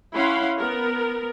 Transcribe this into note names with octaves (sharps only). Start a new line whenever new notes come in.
C#4 E4 F5 F#5 B5 C6
B3 A#4